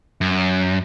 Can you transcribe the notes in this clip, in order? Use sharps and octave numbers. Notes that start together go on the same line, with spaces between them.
F#2